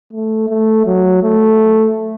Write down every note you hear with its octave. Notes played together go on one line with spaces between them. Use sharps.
A3
A3
F#3
A3